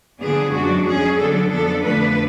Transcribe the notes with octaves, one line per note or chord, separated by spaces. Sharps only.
D3 F3 B3 D4 G#4
F#2 F3 G#3 D4 F#4
F2 F3 G#3 C#4 G#4
D3 F#3 B3 D4 A4
F2 F3 B3 D4 A4
F2 D3 F3 A3 D4 B4